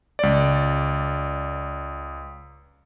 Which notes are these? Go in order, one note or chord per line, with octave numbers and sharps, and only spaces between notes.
C#2 D5